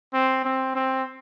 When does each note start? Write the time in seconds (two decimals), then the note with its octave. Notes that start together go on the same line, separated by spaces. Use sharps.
0.13 C4
0.45 C4
0.75 C4